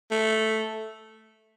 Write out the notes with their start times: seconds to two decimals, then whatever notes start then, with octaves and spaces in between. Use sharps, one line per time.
0.11 A3